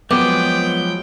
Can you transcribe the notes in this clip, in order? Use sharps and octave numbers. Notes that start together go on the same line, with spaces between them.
F3 F#3 G#3 B3 G5 D6